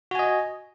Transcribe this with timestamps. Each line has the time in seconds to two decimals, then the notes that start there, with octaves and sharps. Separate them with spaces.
0.11 F#4
0.15 G#5
0.19 D#5